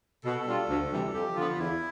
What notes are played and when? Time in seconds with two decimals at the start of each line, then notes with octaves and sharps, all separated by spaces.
0.24 B2 A4
0.46 G3 D4 F4
0.68 D2
0.91 C3 E3 G3
1.13 F2 G4
1.35 D3 F3 B3 F4
1.58 E2 E4